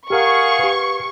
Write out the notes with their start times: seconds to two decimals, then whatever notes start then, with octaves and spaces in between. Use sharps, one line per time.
0.10 G4 G#4 A#4 F5 F#5 C#6
0.59 G4 B4